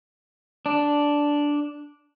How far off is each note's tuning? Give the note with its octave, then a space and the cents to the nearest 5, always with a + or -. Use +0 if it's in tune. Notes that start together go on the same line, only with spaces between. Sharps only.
D4 -5